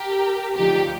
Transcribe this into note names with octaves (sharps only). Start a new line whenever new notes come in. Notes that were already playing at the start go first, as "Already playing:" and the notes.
Already playing: G4 A#4
D2 D3 F3 D#4 G4